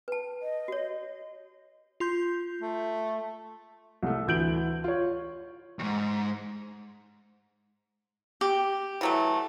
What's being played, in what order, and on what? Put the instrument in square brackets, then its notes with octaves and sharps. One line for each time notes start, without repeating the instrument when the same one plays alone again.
[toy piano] B4 A5
[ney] D#5
[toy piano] F#4 C#5
[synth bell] F4 C6 G6
[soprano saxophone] A3
[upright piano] C2 A3
D2 E3 G6 D7 F#7
F4 C#5
[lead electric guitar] D#2 G#2
[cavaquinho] G4
[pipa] E3 F#3 A3